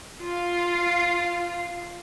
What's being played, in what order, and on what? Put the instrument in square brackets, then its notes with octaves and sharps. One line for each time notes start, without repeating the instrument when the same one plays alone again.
[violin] F4 F5